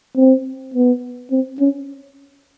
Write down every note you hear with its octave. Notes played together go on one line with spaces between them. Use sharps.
C4
B3
C4
C#4